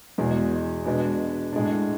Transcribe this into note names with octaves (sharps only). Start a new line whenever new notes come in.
E2 B2 G#3
B2 G#3 B3 D4
A2 G#3 D4